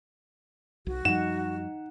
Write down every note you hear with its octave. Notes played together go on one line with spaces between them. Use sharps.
B1 F#4
F#2 F3 G3 D#4 F#5 E7